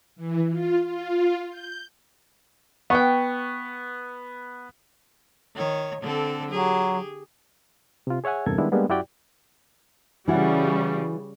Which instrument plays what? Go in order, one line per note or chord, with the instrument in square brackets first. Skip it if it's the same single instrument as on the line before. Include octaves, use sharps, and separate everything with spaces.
[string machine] E3
F4
F4
G6
[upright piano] B3 C#6 [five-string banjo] F#5 G5
[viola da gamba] D#3 C#5
D3 C4 A4
[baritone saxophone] F#3 [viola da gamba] G4 G#4
[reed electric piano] C3 F4
G#4 C#5 E5 F#5 G#5
E2 G2 C3 A4 A#4 G#6
D#3 G3 G#3 B3 D4 E4
G3 G#3 A#3 B3 D4
F#2 E4 F#4 G4 D5 G5
[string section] C#3 G3 [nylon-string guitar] E3 E4 F#4